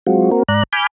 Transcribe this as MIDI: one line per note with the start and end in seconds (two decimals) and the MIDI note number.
0.07 0.31 54
0.07 0.31 56
0.07 0.31 60
0.07 0.31 65
0.07 0.31 66
0.31 0.43 58
0.31 0.43 60
0.31 0.43 66
0.31 0.43 70
0.48 0.63 44
0.48 0.63 74
0.48 0.63 82
0.48 0.63 90
0.73 0.87 80
0.73 0.87 83
0.73 0.87 86
0.73 0.87 89
0.73 0.87 91